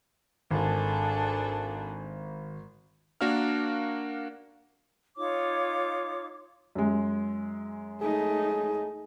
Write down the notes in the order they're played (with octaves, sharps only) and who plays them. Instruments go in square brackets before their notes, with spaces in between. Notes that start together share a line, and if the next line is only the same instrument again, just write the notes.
[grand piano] G#1 [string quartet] D4 G#4 A4
[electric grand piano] A#3 D4 F#4 A#4 F5 F6
[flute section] D#4 F4 C#5 D6
[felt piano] F#2 G#3
[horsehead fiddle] A3 D#4 [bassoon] G#4